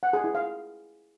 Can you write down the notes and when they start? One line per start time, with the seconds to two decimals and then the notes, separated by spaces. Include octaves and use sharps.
0.03 F#5
0.13 G#4
0.24 E4
0.35 F5